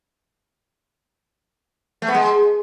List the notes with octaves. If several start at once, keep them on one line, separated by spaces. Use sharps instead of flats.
A3
B3
G#3